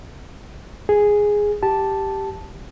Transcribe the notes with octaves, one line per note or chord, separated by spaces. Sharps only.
G#4
G4 A5